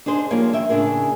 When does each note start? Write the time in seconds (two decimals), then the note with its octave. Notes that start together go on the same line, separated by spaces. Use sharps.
0.06 D4 D#4 G#4 C5
0.30 F3 G3 A#3 C#5 F5
0.53 D#3 E5 G5
0.69 A2 C#3 E3 D4 G#4 A#4